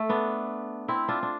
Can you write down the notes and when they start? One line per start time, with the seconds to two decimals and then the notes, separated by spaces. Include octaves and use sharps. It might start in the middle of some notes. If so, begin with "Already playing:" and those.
Already playing: A3
0.09 B3 D4
0.88 C4 E4
1.08 D4 F4
1.23 D4